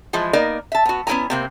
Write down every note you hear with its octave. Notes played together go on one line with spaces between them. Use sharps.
E3 F3 G#3 E4
A#3 B3 D#4 A#4 D5
E5 A5
B3 F#4
B3 C#4 E4 A#4 G#5 A#5
C3 A#3 C4